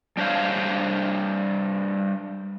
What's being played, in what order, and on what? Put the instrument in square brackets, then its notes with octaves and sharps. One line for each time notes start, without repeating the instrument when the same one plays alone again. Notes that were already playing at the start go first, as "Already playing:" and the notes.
[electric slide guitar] G3 D4 C5 C#5 F5